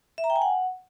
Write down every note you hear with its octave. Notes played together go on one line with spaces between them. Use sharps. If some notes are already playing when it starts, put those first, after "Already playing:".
E5
A#5
G5
G#5
F#5